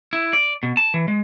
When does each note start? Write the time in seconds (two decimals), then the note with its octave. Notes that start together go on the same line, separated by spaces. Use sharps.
0.13 E4
0.33 D5
0.63 B2
0.77 A5
0.94 E3
1.08 G#3